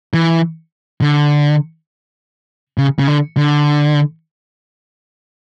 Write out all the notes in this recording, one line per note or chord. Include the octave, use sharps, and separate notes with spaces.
E3
D3
C#3
C#3
D3
D3